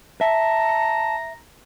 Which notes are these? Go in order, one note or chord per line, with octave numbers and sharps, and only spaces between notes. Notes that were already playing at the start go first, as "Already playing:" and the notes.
E5 A5 A#5